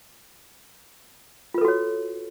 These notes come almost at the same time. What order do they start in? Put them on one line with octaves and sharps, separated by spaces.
F4 B4 A4 F#4 C#5